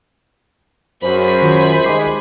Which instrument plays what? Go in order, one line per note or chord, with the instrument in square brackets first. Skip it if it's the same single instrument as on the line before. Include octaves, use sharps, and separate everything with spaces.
[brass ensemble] F#2 [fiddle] G#4 B5 [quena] C5
[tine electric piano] D#3 F4
[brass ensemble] D#3 G3 G#3 [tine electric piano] C6 D6 C7